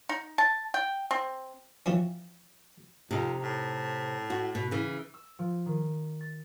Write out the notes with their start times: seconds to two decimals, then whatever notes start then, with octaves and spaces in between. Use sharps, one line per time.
0.09 D#4
0.38 A5
0.74 G5
1.11 C4
1.86 E3 F3 C4 C#4
3.11 F2 C3 D#4
3.43 A2
4.30 F#4
4.55 B2
4.71 C#3 E3
5.14 E6
5.39 F3
5.66 D#3
6.21 A6